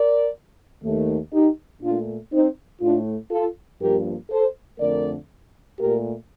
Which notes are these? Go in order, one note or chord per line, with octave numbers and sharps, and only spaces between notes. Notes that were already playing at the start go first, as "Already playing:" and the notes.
Already playing: A#4 D5
D#2 D#3 A3
D#4 G4
A#2 A3 D4 F4
C4 D#4
A2 A3 D4 F4
F4 A4
G2 F3 A#3 G4 A#4
A4 C5
F2 D3 A3 A#4 D5
A#2 A3 G4 A#4